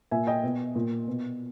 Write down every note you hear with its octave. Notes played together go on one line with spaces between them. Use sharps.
A#2 E5 G#5
D#5 G5
B2
A#2
B2